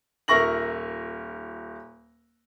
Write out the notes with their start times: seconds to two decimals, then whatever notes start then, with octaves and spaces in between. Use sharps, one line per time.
0.28 D#1 A#4 E5 C#6 A#6 F#7